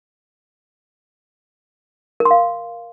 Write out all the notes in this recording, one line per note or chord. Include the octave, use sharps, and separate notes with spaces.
A#4
C6
F5